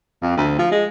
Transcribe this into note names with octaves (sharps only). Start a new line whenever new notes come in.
F2
D2
F3
G#3